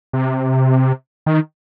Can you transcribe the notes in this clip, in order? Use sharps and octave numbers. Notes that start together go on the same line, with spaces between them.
C3
D#3